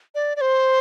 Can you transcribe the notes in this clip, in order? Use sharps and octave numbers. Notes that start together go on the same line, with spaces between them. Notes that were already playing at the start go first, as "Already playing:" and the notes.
D5
D5
C5